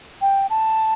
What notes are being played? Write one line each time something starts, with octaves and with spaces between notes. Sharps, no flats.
G5
A5